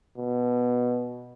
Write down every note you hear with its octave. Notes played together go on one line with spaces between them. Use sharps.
B2